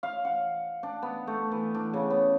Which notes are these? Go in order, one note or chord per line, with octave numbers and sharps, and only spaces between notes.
F5
F#5
D4
B3
A3
E3
D4
C#3
B3